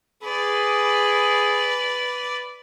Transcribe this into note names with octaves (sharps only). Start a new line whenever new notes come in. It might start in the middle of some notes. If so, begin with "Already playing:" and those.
G#4 B4 D5